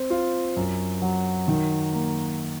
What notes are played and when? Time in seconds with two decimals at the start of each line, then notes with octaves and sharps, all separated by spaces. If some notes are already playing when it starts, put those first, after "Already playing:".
Already playing: C4
0.10 F4
0.56 F#2
1.02 F#3
1.48 D#3
1.93 A#3